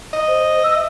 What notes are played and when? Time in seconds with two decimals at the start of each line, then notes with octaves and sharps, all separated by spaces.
0.13 D#5
0.27 C5
0.63 E6
0.75 E5